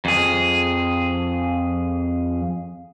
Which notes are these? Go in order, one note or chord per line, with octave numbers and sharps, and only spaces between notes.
F2 G#4